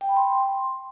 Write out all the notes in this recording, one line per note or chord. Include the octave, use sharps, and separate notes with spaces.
G5
B5
C6